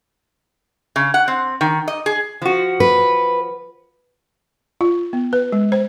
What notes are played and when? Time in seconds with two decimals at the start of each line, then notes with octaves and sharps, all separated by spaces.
0.96 C#3
1.14 F#5
1.28 C4
1.61 D#3
1.88 D#5
2.06 G#4
2.42 F3 F#4
2.80 B4
4.81 F4
5.13 B3
5.33 B4
5.52 G#3
5.72 C5